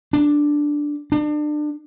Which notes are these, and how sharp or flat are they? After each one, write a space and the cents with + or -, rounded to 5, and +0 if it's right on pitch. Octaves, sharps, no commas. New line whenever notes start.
D4 +0
D4 +30